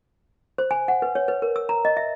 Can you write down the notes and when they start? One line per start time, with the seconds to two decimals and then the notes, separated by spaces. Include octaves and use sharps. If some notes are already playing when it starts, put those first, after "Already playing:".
0.58 C5
0.71 G#5
0.88 F#5
1.02 B4
1.15 C#5
1.28 B4
1.42 A#4
1.56 E6
1.69 A#5
1.85 D#5
1.97 E5